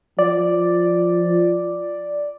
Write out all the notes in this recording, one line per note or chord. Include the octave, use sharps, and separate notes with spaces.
F3 D5